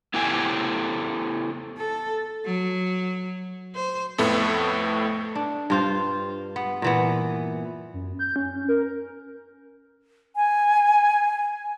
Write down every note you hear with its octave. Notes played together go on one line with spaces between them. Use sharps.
B3 E4 G4 A4 G5 G#5
A4
F#3
C5
F2 A2 A3 B3
D4
G2 F4 C5
B3
A#2 E3 B3
F#2
G6
C#4
A#4
G#5